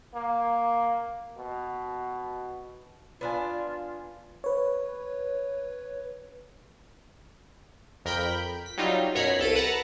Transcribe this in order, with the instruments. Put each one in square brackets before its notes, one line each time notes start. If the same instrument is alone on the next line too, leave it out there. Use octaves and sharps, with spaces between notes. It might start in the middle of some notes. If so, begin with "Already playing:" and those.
[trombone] A#3
B2
[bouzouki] B3 D4 G#5 [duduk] F4
[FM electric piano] B4 C#5
[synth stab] F2 A#4 G5 B5 G6
B6
F#3 G3 D#4 F4
F#2 B2 C#5 A#5 B5 C7
C2 A4 D7 D#7
B4 F#5 A5 A#5